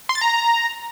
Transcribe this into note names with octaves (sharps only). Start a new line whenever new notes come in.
C6
A6
A#5